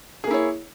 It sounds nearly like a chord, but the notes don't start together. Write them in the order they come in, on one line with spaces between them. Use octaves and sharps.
G#4 A#3 E4 C#5